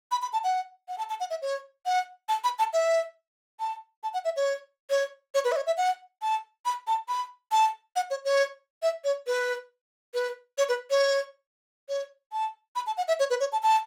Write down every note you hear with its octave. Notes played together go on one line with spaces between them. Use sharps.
B5
B5
A5
F#5
F#5
A5
A5
F#5
E5
C#5
F#5
A5
B5
A5
E5
A5
A5
F#5
E5
C#5
C#5
C#5
B4
E5
C#5
E5
F#5
A5
B5
A5
B5
A5
F#5
C#5
C#5
E5
C#5
B4
B4
C#5
B4
C#5
C#5
A5
B5
A5
F#5
E5
C#5
B4
C#5
A5
A5